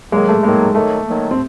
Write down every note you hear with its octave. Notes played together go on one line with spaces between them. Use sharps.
D#3 F#3 G#3 A#3
A3
D#3 F#3 G#3 A#3
D#3 F#3 A3 A#3
D#3 F#3 A#3
C4